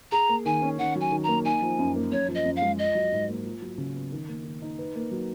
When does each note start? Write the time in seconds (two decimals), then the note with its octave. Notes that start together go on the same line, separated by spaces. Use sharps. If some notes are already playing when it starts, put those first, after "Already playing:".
0.12 G#4 A#5
0.29 A#3
0.46 D#3 G#5
0.62 C#4
0.79 D#3 F#5
0.96 F#3 G#5
1.12 D#3
1.24 A#3 A#5
1.45 D#4 G#5
1.62 F3
1.79 F#2
1.96 A#3
2.12 F#2 C#5
2.28 F3
2.35 D#5
2.46 F#2
2.56 F5
2.62 G#3
2.79 F4 D#5
2.95 F#3
3.12 G#2
3.29 A#3
3.45 F4
3.62 F#3
3.78 C#3
3.95 B3
4.12 D#3
4.28 A#3
4.45 D#3
4.62 D#4
4.79 B4
4.96 A#3
5.12 F#3